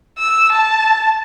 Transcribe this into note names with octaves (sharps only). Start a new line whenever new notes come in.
E6
A5